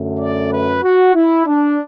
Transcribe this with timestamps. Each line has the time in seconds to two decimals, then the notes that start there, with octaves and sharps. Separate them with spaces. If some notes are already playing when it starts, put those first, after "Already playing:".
Already playing: F#2 D3 A3
0.20 D5
0.51 B4
0.83 F#4
1.15 E4
1.46 D4